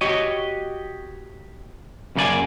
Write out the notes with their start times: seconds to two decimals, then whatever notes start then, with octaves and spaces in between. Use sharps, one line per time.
0.01 F#4 G4 C#5 D#5
2.16 F#2 C#3 A#3 D4 D5 G#5